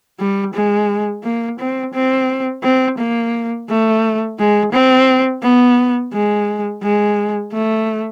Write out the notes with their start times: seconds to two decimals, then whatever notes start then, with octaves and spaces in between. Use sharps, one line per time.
0.19 G3
0.54 G#3
1.24 A#3
1.59 C4
1.94 C4
2.63 C4
2.98 A#3
3.69 A3
4.39 G#3
4.72 C4
5.43 B3
6.12 G#3
6.82 G#3
7.52 A3